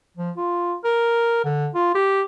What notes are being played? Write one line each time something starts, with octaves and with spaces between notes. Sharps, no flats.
F3
F4
A#4
D3
F4
G4